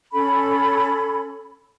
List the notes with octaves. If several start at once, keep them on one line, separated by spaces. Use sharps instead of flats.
C#4 A4 B5